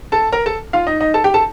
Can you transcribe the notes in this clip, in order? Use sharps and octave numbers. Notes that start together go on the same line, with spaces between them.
A4 A5
A#4 A#5
A4 A5
F4 F5
D#4 D#5
D#4 D#5
A4 A5
G4 G5
A4 A5